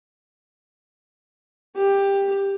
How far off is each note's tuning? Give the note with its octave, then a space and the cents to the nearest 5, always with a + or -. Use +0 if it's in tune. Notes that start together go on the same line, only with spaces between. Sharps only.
G4 +10